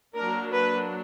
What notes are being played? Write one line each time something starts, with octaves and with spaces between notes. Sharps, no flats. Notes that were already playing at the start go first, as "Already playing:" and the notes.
F#3 A#3 D4 A#4
B4